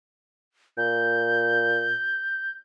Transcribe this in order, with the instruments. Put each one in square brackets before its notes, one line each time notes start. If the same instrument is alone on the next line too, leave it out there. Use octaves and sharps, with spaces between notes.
[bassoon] A#2 [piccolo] G6